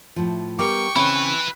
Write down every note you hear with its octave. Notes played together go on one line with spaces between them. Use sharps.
A2 F3
G3 B3 A#4 G5 C#6 D6
C#3 C4 C#4 E4 B4 B5